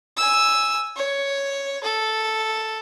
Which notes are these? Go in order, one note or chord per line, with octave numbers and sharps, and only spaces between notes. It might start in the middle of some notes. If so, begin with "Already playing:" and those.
G#5 E6
C#5
A4